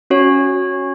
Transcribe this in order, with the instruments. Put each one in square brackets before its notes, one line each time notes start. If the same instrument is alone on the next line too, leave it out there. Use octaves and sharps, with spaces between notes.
[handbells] C#4 F#4 C#5